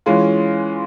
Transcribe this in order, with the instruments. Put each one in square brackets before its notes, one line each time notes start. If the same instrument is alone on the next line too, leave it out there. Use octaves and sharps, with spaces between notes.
[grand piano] E3 G#3 C#4 F4